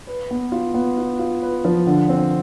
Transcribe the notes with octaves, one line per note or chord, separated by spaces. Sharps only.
B4
B3
F4
B3
F4
F4
B4
F3
D3
C4